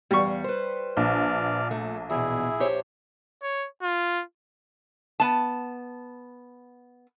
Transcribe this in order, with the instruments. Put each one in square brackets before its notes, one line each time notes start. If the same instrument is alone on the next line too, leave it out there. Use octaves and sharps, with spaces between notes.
[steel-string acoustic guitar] E2 F5 [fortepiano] G3 C#6
[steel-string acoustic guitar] B4 C5
[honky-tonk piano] A#1 [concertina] D5 F6
[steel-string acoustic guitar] A3
[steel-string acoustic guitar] E2 B2 [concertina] E4 G#4
[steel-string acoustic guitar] G4 C5 C#5
[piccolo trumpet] C#5
F4
[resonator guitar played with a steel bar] B3 A5